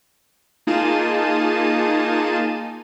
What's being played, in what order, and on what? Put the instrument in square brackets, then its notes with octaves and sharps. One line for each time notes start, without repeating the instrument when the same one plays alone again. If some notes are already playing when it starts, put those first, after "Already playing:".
[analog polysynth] A#3 D#4 F4 G#4 A5 D#7